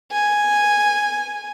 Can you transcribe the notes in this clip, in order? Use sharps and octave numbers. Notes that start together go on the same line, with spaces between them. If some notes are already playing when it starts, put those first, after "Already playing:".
G#5